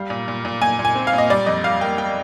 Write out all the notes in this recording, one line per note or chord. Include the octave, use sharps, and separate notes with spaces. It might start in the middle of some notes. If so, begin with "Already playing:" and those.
Already playing: G3 F5
A#2
A#2
A#2
A#2 G#5
A#2
G#5
C4
F5
A#2
D#5
G3 D5
F2 D#5
G3 F5
A#3 G5
G5